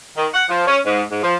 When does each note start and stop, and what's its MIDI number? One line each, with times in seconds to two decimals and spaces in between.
0.17 0.28 51
0.34 0.44 78
0.50 0.65 53
0.67 0.79 61
0.85 1.02 44
1.11 1.21 44
1.23 1.35 53